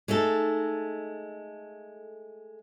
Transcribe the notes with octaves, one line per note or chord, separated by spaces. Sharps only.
G#3 A3 D#4 A4